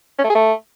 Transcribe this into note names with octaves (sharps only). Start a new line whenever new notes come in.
C#4
A3
G#4
A3